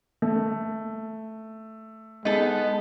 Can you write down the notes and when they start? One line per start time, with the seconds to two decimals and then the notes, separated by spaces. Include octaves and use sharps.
0.22 A3
2.25 G#3 B3 D#4 A4